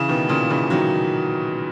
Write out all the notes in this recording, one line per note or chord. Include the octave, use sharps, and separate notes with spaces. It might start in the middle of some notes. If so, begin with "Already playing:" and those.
Already playing: C#3 E3
B2 D#3
A#2 C#3
C#3 E3
D#3 F#3